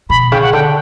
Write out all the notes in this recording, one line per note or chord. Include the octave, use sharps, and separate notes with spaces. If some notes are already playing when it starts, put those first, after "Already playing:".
B2 B5
C#3 G5
F#5
D3 G5